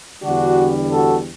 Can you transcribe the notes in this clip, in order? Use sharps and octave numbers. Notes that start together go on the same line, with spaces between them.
E2 D3 G3 D4 F#4
F#4 A4